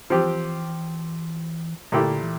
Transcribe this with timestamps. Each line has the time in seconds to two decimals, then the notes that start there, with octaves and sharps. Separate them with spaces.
0.10 E3 F3 C4 G4
1.92 A#2 D3 A3 E4 G4
2.23 E3